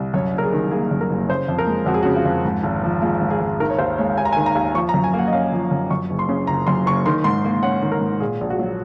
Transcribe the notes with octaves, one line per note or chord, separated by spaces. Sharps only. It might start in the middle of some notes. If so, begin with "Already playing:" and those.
Already playing: C2
F#2 C#5
F#1 A#4
G#4
D#3
A#3 G#4
F#2
A#4
F#1
C#3 C5
F2
A#4
G#3
F2 F#4
G#4
F#4
C#3
F4
F2
G#2
G#1
F3
G#3 F4
G#2
G#4
G#1
D#3 A#4
C#5
D#2 C5
G#3 C#5
D#2 G#5
A#5
G#5
D#3
A#5
D#2
F3 C#6
A#5
F#2
G#5
A#3
F#5
D#5
C#4 F5
F3
F#2
F#2 C#6
F#1
C6
C#3
F#1 A#5
F#2 C6
F#1 C#6
D#3 C6
G#2 C6
A#3
C#4 F#5
D#3
A#4
G#2
A#2 G#4
A#1
F#4
F#3